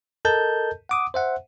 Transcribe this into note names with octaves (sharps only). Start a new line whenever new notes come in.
A4 A#4 D#5 A5 G6
F#5 D6 D#6
C5 E5 F#5